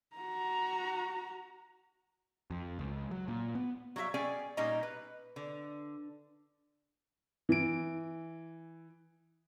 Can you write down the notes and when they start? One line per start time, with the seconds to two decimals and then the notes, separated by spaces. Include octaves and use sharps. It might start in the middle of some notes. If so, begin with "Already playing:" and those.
0.16 F#4 A#5
2.50 F2
2.79 C#2
3.11 F#3
3.28 A#2
3.55 B3
3.96 F#3 G3 E4 E5 F5
4.14 C#4 G#4 D5 G5 G#5
4.57 A#2 G3 C#4 D#4 D#5 A#5
4.83 B4
5.36 D3
7.49 E3 D7